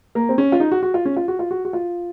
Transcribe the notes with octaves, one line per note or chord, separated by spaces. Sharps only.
A#3
C4
C#4
F4
D#4
F#4
F#4
F4
C#4
F4
F#4
F4
F#4
F#4
F4